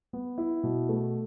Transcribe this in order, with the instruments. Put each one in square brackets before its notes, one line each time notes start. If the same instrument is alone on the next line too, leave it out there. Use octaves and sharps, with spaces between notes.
[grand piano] B3
E4
B2
A3